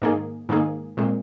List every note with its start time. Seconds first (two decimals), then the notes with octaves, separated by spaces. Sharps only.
0.02 G#2 D#3 A#3 G#4
0.49 G#2 D#3 A#3 G#4
0.97 A#2 G#3 C4